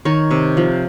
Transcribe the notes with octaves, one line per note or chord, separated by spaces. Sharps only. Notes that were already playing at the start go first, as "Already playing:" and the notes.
D#3 C#5
C3
F3